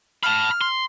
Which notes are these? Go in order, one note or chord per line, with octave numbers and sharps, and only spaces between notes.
A5 B5 F6
C6